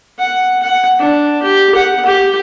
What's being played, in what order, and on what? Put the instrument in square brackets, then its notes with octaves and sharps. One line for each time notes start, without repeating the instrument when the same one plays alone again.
[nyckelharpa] F#5
F#5
D4
G4
F#5
G4